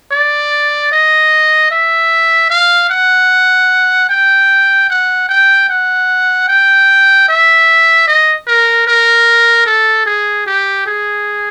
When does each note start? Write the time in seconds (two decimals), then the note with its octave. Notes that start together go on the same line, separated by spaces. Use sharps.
0.11 D5
0.92 D#5
1.71 E5
2.50 F5
2.90 F#5
4.09 G5
4.90 F#5
5.29 G5
5.70 F#5
6.48 G5
7.29 E5
8.08 D#5
8.47 A#4
8.87 A#4
9.66 A4
10.06 G#4
10.47 G4
10.86 G#4